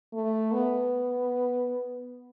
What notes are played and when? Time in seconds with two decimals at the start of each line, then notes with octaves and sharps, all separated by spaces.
0.13 A3
0.52 B3